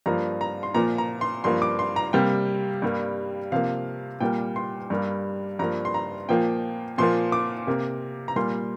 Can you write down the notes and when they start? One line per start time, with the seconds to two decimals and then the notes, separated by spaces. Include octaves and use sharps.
0.06 G2 F3 A#3 A#5
0.41 A#5
0.63 C6
0.74 A#2 F3 A#3 A#5
0.98 A#5
1.21 C6
1.44 G2 F3 A#3 C6
1.62 D6
1.79 C6
1.96 A#5
2.13 C3 G3 A#3 G5
2.82 G2 G3 A#3
3.52 C3 F3 A#3 F5
4.20 A#2 G3 A#3 G5
4.56 C6
4.90 G2 G3 A#3
5.59 G2 F3 A#3 A#5
5.85 C6
5.94 A#5
6.29 A#2 F3 A#3 G5
6.98 A#2 F3 A#3 C6
7.32 D6
7.67 C3 A#3
8.28 A#5
8.36 A#2 G3 A#3 C6